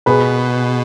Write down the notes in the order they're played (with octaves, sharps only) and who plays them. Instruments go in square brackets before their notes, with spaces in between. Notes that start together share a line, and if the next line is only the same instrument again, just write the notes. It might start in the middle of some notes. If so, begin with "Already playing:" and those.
[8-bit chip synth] B2 [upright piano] G#4 B4